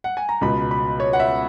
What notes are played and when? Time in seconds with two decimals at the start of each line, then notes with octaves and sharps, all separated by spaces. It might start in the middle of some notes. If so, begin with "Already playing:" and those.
0.04 F#5
0.17 G#5
0.29 A#5
0.41 C#2 B2 B5
0.71 B5
1.00 C#5
1.13 F#5
1.20 E5